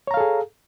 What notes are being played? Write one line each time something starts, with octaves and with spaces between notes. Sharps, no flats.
G#4 A4 C#5 F5 A#5